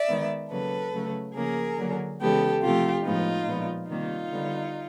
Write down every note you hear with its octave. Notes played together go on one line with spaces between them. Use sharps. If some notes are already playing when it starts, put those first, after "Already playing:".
Already playing: D5 E5
D#3 G#3 B3
C#3 F#3 A#3 A4 B4
C#3 F#3 A3
C#3 F3 A#3 G#4 A#4
D3 F#3 A#3
C#3 E3 G#3 B3 G4 A4
C3 F3 A3 F4 G4
A2 F3 G#3 B3 D#4 F4
A#2 F3 G#3 B3
C3 D#3 G3 A#3 D#4 F4
D3 G3 B3